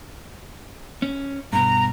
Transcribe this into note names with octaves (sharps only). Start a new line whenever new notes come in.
C#4
G2 B2 A#5